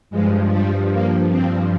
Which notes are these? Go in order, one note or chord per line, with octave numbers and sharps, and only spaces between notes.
G2 F3 G#3
G3
A#3
C4